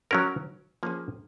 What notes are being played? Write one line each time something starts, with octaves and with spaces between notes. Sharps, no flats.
F#3 C#4 F#4 A#4
F3 A#3 C#4 G#4